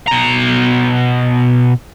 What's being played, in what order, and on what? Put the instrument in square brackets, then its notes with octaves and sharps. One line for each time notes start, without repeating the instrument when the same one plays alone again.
[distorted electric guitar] B2 A#5